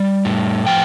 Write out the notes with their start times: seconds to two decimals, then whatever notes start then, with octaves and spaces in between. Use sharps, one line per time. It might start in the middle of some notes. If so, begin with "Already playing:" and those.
Already playing: G3
0.25 A2
0.67 F3 G5